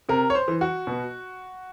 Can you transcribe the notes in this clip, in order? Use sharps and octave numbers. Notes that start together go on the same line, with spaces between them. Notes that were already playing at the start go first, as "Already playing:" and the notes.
C3 A#4
C#5
C5
E3
F#4
B2